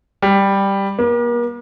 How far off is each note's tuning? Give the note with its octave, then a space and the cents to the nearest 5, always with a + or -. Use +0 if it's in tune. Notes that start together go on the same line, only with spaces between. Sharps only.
G3 +5
A#3 +40